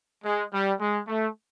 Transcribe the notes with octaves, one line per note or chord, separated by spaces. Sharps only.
G#3
G3
G#3
A3